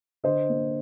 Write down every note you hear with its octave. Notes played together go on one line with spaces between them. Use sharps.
D3 C5 D#5
A#3